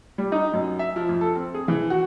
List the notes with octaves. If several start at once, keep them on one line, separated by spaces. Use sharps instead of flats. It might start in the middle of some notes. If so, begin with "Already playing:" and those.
G3
D#4
F#2
E5
F3
F2
A4
C4
G#4
E3
F#4